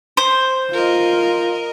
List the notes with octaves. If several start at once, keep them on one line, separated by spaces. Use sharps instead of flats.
C5
F4 A#4 D#5